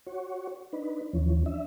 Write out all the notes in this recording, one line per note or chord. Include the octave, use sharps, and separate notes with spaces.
F#4 C#5
D4 D#4 B4
D#2 E3 F3 C#4
D4 E5